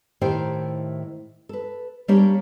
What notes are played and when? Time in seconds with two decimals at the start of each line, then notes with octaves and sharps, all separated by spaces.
0.21 A2 D#3 E4 G4 C5 G5
1.49 A4 B4
2.08 G3 A#3 D4 G4 C#5 D5